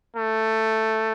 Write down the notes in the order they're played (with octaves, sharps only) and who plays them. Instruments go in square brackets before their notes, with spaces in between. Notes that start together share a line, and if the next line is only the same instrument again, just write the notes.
[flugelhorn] A3